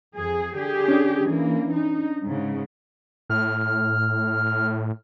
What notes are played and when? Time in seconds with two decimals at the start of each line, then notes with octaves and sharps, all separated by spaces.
0.16 F2 G#4
0.56 D3 G4 G#4
0.88 C#4 D4
1.25 E3 A#3
1.75 D#4
2.25 G#2 C#3
3.30 A2 F6